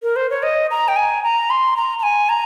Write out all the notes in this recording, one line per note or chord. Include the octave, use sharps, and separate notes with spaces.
A#4
C5
C#5
D#5
A#5
G5
G#5
A#5
C6
A#5
A#5
G#5
A#5